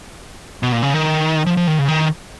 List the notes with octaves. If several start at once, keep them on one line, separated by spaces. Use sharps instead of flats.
B2
A#2
C#3
D#3
F3
F3
D#3
C#3
D#3